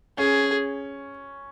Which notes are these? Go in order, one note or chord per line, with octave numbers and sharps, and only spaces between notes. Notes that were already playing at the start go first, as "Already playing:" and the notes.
C#4 G#4